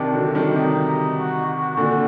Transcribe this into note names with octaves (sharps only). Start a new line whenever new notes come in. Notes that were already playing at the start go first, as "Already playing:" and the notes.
Already playing: C3 D#3 D4
D3 F#3
D#3 G3
C3 D#3 D#4
F#4
F#4
A#2 D3 F#4